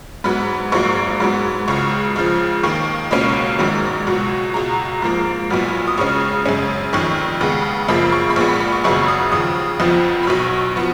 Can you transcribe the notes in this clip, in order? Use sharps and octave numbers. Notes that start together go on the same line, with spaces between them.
G#2 F#3 B3 B5
A#1 G#2 F#3 A#3 C#6
G#2 F#3 B3
C#2 C#3 G#3 C#6
C#2 C#3 F3
D#2 D#3 A#3 C#6
C#2 B2 A#3 C#4 B5
A#1 G#2 D#3 F#3
C#2 B2 F#3
C#2 B2 G#3 A#5
G#2 F3 A#3
B1 A#2 F#3 B3
D#6
C#2 C#3 G#3 C#4 C#6
F#2 C#3 G#3 C#4
F1 F2 D#3 C#6
D#2 C#3 G#3 B3
F#2 C#3 F3 A#3 B5
C#6
B5
A#1 A#2 G#3 B3 C#6
B5
B5
C#6
G#1 F#2 C#3 F#3 B3 C#6
D#6
D#2 C#3 F3 D#6
F#1 F2 F3 B3
B5
B1 B2 F#3 C#6
F3 B3